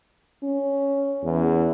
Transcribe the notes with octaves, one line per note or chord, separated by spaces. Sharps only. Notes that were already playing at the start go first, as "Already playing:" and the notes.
C#4
E2